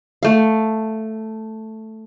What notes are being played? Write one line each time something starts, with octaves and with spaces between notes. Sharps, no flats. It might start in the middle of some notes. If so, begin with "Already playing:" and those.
A3 F5